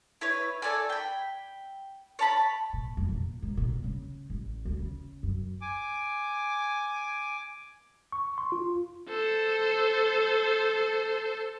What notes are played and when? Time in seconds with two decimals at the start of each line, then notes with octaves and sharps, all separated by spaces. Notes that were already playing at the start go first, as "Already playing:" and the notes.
0.21 E4 B4 C#5
0.62 A4 C#5 D5 G#5
0.90 G5 B5
2.19 C#5 A5 B5
2.73 A#2
2.97 F2
3.09 A#2
3.42 G#2
3.57 A#2
3.84 C#3
4.30 A1
4.65 D2
4.79 C#3
5.23 F#2
5.61 G#5 D6
8.12 C#6
8.38 C6
8.52 F4
9.09 A4 C5